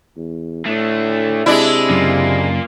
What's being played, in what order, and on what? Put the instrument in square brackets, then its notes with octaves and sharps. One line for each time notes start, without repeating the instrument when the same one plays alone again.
[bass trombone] E2
[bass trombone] A2 [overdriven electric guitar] A3 D4
[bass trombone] C3 [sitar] G#3 D4 E4
[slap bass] F#2 C#3 F#3 [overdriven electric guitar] A#3 F4